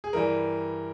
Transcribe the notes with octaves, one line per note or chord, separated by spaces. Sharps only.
G#4
G2 E3 G3 A#4